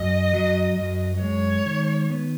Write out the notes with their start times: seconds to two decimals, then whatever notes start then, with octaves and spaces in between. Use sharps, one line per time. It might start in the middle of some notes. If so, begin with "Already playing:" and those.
Already playing: F#2 D#5
0.33 F#3
0.77 F#2
1.22 G#3 C#5
1.66 D#3
2.10 B3